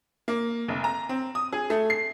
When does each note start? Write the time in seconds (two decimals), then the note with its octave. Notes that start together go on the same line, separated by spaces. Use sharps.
0.28 A#3
0.68 F1
0.84 A#5
1.09 C4
1.35 D#6
1.52 G#4
1.70 A3
1.90 C7